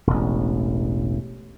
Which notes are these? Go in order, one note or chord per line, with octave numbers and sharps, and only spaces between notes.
E1 A1